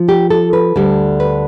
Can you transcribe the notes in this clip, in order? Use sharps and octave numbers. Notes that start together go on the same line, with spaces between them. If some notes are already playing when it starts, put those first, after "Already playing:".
Already playing: F3
G4
A4
B4
D2 D3 G3
B4